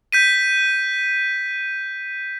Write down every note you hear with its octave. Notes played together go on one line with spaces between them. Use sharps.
G6 B6 D#7